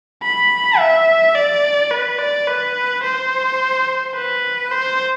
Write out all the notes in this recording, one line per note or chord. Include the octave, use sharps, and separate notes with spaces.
B5
E5
D5
B4
D5
B4
C5
B4
C5